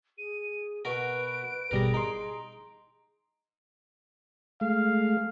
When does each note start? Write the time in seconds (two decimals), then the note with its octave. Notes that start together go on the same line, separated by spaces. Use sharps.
0.18 G#4 D#7
0.85 B2 F#4 A#4 B4 D7
1.71 G#1 B2 G3 G#4 A#4 A#6
1.94 D#4 A#5 C6
4.61 G#3 A3 F5